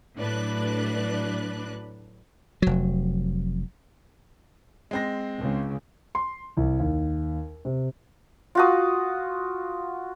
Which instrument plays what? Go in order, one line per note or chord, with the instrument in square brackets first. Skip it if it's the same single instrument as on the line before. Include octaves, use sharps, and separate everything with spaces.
[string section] A2 F#3 D4 B4 F#6
[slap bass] F1 F#3
[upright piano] G#3 C4 A#6
[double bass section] C#2 C#3
[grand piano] C6
C2
D#2
C3
[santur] F4 F#4 D#6